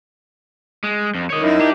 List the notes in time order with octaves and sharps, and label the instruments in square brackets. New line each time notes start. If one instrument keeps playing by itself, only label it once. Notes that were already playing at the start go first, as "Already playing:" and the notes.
[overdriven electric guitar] G#3
F2
[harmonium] D#3 [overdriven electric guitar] C#5 D#5
[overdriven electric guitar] F#2 [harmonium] D#4 E4 A#4
[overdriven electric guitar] D4 G4